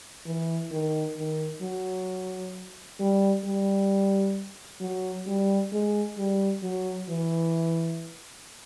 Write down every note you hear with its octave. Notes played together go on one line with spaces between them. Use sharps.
E3
D#3
D#3
F#3
G3
G3
F#3
G3
G#3
G3
F#3
E3